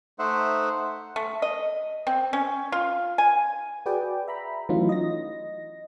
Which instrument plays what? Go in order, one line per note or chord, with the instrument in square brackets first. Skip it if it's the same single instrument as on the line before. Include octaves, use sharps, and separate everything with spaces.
[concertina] A3 D#4 C5 E5 F#5
[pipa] A3
D#5
C4
C#4
F4
G#5
[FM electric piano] F#4 G#4 B4 D5 G5
E5 A#5 B5
E3 F#3 A3 C#4 D#4 F4
D#5 A#6